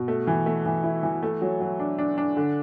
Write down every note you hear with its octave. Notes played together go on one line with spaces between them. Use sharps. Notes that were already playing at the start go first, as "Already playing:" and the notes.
Already playing: B2
A3
E3
A3
E3
E4
E3
A3
F#3
F#3
D4
D4
D4
D3